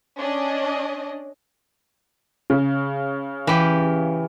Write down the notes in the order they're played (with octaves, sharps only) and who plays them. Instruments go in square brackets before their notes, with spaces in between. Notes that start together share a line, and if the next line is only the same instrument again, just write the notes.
[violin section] C#4 D4 D#5
[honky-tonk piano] C#3
[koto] E3 G4